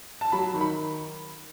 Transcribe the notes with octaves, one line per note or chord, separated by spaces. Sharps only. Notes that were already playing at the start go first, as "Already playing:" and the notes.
A5
F#3 B5
D#3
B5